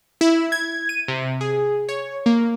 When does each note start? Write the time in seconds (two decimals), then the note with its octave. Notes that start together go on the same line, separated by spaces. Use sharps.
0.21 E4
0.52 G#6
0.89 D#7
1.08 C3
1.41 G#4
1.89 C#5
2.26 A#3